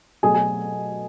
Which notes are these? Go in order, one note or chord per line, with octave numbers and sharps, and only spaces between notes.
B2 F#3 A3 G#4 G#5
G#4 G#5